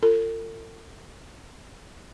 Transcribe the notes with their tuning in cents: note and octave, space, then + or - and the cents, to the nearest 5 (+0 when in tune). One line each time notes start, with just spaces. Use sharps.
F4 +0 A4 +45